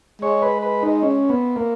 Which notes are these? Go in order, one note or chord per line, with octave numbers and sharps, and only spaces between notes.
G#3 C#5
B4
B4
D#4
C#4
B3
A#3